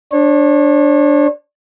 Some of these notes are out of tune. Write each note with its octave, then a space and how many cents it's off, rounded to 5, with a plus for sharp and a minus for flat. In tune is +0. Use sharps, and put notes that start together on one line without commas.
D4 +0 C#5 -35